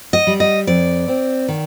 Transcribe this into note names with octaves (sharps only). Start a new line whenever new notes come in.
D#5
G3
D#5
F2 D5
C4
D#3